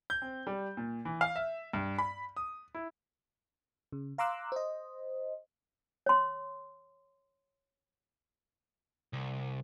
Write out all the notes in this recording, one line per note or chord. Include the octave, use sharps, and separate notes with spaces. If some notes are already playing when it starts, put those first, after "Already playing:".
G6
C4
G3
A#2
E3
F5
E5
G2
B5
D#6
E4
C#3
F5 A#5 C6 D6 E6 F#6
C5 D#5
C#5 C6
C2